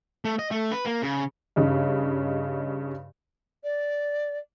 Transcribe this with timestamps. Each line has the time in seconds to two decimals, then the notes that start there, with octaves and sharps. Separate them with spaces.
0.25 A3
0.39 D#5
0.51 A3
0.72 B4
0.86 A#3
1.03 C#3
1.56 G2 C#3 D#4
3.63 D5